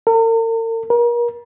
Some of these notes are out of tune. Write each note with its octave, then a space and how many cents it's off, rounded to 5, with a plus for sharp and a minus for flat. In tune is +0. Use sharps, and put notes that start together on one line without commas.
A#4 -45
A#4 +35